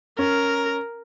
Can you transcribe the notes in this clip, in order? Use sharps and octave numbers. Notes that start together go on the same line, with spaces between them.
C#4 A#4